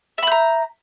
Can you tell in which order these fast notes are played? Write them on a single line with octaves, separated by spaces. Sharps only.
E5 B5 G6 A#5